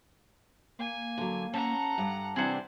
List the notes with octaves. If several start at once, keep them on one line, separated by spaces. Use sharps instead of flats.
A#3 G#5
D3 F#3
C#4 A4 F#5 A#5
G2
C3 E3 C4 D4 G#4 C5 F#5